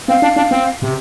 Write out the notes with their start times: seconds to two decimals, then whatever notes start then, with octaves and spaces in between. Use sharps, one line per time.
0.08 C4 F5
0.22 D4
0.36 D4
0.51 C4
0.82 C3